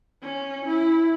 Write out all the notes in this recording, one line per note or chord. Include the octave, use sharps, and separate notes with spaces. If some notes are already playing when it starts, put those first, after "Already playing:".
C#4
E4